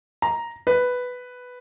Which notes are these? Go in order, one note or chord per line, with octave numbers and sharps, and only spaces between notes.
A#5
B4